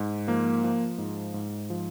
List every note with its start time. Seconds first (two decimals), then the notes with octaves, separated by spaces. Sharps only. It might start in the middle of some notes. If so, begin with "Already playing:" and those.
Already playing: G#2
0.28 F3 A#3
0.64 F3
0.98 G#2
1.34 G#2
1.70 F3